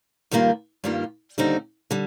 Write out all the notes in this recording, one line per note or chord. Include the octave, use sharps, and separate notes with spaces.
G2 D#3 G3 A#3 F4
G2 D#3 G3 A#3 F4
D#2 D3 G3 C4 D#4
D3 G3